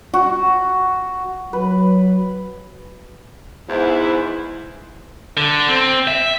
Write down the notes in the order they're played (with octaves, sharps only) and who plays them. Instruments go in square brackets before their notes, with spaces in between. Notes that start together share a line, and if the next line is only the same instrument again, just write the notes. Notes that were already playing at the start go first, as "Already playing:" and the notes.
[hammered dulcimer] F#4
[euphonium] F#3 [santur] B4
[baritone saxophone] E2 [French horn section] G#2 E4 C5
[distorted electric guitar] D3
C4
E5